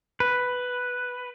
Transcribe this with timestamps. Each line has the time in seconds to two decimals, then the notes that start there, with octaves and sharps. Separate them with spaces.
0.20 B4